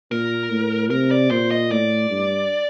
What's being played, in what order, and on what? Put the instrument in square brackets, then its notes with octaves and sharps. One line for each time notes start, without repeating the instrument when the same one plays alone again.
[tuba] A#2 [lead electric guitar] A#4
[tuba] A2
[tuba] C3 [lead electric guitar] A#4
[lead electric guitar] D5
[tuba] A#2 [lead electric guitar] C5
[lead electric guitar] D#5
[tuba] A2 [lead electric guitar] D5
[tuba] G2